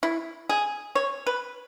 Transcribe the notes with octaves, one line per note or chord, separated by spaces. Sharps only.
E4
G#4
C#5
B4